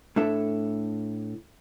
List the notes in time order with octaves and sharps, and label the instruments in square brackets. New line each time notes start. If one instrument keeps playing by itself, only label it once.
[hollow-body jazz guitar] A2 D4 A4 E5